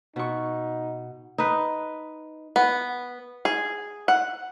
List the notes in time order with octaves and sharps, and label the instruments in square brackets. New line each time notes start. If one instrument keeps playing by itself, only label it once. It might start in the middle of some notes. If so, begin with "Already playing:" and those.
[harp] B2 C#6 [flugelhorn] D#4
[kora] D#4 B4
[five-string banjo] B3
G#4
F#5